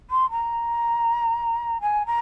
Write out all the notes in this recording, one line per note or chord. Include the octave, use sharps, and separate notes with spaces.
C6
A#5
G#5
A#5